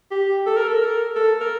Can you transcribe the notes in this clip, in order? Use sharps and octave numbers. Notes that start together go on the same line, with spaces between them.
G4
A4
A#4
A4
A#4
A4
A#4